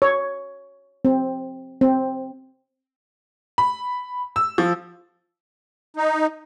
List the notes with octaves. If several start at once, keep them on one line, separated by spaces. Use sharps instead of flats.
C#5
C4
C4
B5
E6
F3
D#4